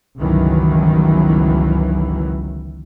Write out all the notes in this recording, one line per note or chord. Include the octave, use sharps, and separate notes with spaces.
G1 C#2 D#3 E3 F#3